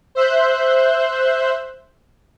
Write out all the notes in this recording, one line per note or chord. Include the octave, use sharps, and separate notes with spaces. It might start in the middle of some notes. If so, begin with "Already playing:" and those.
C5 E5 F#6 G6